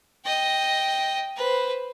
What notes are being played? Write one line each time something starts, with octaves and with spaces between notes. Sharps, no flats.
D#5 G5
B4 C5